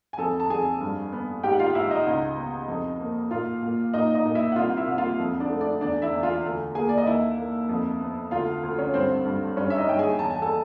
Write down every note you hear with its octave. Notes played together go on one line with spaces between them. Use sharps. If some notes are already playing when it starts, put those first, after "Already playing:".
G#5
F2 A4 A5
A5
F2 G#4 G#5
G2
B3
G#2 G4 G5
F#5
F4 F5
G#2 E4 E5
D#4 D#5
C#2
B3
F2
A#3
A#2 F4 F5
A#2
A#2 D#4 D#5
D#4 D#5
A#2
E4 E5
F#5
C2 F4 F5
E4 E5
C2
F4 F5
F2
D4 D5
A3
D4 D5
E2 D4 D5
E4 E5
E2
F4 F5
D2
A#3 G#4 G#5
D5
D#5
D#2 E4 E5
A#3
F2
B3
D2 F4 F5
D2
C#4 C#5
G2 C4 C5
G2
G2 C#4 C#5
E5
D#4 D#5
G2 G5
G#4 G#5
E2 A5
G#5
A4 A5